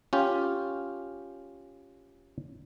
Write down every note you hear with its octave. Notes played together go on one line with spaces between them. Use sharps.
C#4 F4 G4